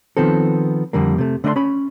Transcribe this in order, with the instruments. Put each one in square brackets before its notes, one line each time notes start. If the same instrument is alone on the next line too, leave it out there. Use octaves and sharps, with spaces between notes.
[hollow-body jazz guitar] D#3 F3 B3 C4 A4
F2 D3 G3 A#3
C3 A3
D3 A3 D4 D5 A#5 C6
C#4 B5